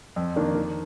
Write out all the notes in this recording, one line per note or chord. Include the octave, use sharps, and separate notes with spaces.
F2
D#3 A#3 D4
D#3